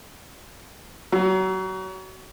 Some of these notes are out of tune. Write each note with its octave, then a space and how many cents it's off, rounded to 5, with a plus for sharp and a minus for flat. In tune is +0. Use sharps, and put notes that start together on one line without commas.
F#3 +30